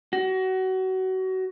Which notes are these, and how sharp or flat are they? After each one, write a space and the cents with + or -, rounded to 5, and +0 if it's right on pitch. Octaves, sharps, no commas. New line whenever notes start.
F#4 +25